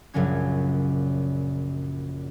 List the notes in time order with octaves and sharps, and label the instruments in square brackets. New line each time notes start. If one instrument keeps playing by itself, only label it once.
[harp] A#1 F#2 C#3 F#3 C#4 G#6